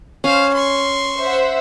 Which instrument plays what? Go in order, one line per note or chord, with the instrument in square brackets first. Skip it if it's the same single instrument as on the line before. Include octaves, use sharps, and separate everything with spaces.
[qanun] C#4 [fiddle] C5 F5
[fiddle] C6 C#6
[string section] C5 E5 F#5